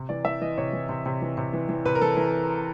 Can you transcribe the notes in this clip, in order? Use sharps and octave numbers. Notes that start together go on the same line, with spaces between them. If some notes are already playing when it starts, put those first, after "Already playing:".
Already playing: C3
E3 D5
E3 E5
E3 D#5
C3 C#5
E3
C3
C3
E3
C3
E3
E3
C3 B4
A#4
E3 A4
E3